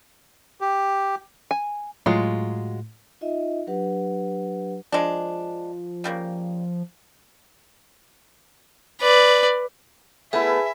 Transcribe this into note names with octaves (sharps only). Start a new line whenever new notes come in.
G4
G#5
A2 F#3 G#3 F4
D#4 F4 D#5 E5
F#3 D4 G4 B4 F#5
F3 G#3 D4
C#3 G3 A#3
B4 D5
A3 B3 E4 G#4 B4 E5 G#5 A5